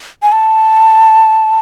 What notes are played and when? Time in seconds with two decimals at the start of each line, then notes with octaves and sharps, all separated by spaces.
0.23 G#5
0.32 A5